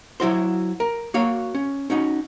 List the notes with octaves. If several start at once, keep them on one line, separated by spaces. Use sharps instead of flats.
F#3 E4 F#4 C5
A#4
A#3 F#4 C#5 F5
C#4
C#4 D#4 F#4